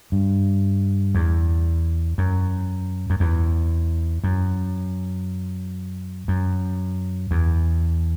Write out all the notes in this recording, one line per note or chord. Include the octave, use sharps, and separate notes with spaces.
G2
E2
F#2
F#2
E2
F#2
F#2
E2